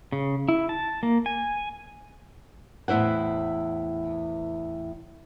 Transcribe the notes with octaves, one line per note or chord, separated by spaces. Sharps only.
C#3
E4
A5
A#3
G#5
E2 A2 E4 C5 F#5